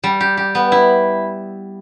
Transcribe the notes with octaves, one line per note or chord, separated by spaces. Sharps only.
G3
G4
G4
B3
E4